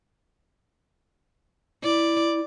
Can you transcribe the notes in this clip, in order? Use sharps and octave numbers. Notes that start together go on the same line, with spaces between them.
E4 D5